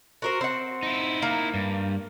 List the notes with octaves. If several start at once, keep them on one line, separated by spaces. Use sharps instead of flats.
F#4 A#4 C5
C4 F#5
D#4 E4
A#3
G2